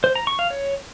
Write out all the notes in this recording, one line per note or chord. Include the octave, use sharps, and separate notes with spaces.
C5
A#5
C#6
F5
C#5